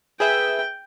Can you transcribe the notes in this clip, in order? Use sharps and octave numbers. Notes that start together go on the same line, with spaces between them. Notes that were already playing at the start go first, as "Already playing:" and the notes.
G#4 B4 E5 G5